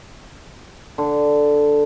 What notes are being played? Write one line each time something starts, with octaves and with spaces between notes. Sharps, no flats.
D3